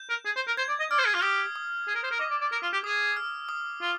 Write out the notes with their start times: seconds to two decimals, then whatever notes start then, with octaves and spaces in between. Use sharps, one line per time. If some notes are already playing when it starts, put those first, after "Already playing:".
Already playing: G6
0.10 A#4
0.25 G#4
0.36 C5
0.47 A#4
0.57 C5 G#6
0.69 D5
0.80 D#5
0.91 D5 F6
0.99 C5
1.06 G#4
1.14 F4
1.22 G4 D#6
1.56 D#6
1.87 G#4
1.95 A#4
2.04 C5
2.11 A#4
2.19 D#5 D6
2.31 D5
2.41 D5
2.52 A#4 D6
2.63 F4
2.73 G4
2.84 G#4 D#6
3.16 F6
3.49 D#6
3.82 F4